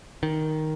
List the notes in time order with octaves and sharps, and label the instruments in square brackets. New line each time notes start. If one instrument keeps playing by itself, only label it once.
[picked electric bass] D#3